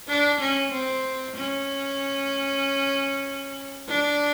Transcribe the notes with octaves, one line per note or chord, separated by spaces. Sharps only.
D4
C#4
C4
C#4
D4